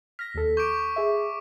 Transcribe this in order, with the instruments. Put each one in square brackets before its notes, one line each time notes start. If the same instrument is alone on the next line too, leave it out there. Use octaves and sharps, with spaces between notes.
[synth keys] F6 A#6 [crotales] B6
[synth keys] D#2 A4
[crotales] C#6 D6 D7 [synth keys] G6
[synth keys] G#4 E5